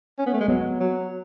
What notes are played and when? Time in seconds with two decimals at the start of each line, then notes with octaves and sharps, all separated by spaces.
0.19 C#4
0.26 B3
0.33 A3
0.40 G#3
0.48 F#3 B3
0.80 F#3